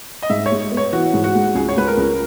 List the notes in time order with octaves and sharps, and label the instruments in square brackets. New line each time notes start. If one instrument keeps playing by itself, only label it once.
[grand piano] D#5
[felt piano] G#2 [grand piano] E5
[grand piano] C#5
[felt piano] G#3
B3
[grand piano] C#5
[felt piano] E3 [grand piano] F#4
[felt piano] G#2
[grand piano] F#4
[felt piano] G#3
[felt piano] C#2 [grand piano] G#4
[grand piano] C#5
[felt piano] G#3 [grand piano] B4
[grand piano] A#4
[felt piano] C#2